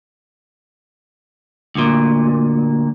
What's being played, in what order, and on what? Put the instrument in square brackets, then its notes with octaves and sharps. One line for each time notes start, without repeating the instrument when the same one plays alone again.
[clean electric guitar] D2 A#2